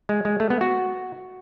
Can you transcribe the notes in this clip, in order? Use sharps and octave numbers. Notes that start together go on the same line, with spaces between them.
G#3
G#3
A3
B3
F#4